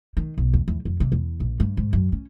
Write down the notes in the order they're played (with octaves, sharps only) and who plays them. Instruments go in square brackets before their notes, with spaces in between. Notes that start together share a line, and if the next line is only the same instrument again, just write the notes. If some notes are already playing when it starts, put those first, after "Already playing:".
[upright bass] D#3
B1
E2
E2
F2
C3
E2
A#1
G2
G#2
F#2
C#4